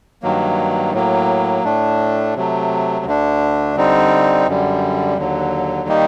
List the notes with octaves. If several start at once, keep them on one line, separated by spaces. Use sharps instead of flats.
G2 D#3 F#3 A#3
A2 F#3 A#3
A2 A3 D4
C3 F#3 A3
D2 D3 A3 D4
D3 G3 C4 D#4
F#2 D3 G3
D#2 D3 F#3
D#3 G3 A#3 D#4